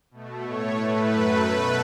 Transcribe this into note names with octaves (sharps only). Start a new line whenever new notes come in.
B2 A3
A2 A3 C#5
A2 A3 B4
F#2 F#3 A3 B4
B2 A3